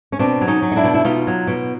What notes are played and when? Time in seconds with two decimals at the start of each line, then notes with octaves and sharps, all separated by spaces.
0.12 C#4
0.19 B2 C4 D4
0.41 F#3
0.47 C#4 D#4
0.62 F#3
0.72 D#4
0.76 D4 E4
0.84 B2
0.94 E4
1.04 B2 D#4 F4
1.27 F#3
1.47 B2